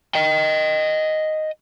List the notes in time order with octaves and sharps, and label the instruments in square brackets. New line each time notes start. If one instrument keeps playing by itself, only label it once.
[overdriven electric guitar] D#5 G5